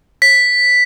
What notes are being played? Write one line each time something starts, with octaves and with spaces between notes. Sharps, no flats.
B6